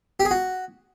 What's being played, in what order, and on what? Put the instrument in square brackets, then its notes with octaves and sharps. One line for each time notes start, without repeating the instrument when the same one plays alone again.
[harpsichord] G4
G#4
F#4